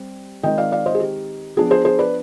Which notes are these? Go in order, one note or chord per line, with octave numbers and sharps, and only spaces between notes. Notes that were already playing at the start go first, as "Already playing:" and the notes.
Already playing: G3 C4
D#3 G#3 C4 D#5 G5
D5 F5
D5 F5
C5 D#5
G#4
G4
F3 B3 D4 G#4
G#4 C5
G#4 C5
B4 D5